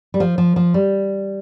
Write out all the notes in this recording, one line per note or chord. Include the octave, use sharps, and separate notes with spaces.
G3
F3
F3
F3
G3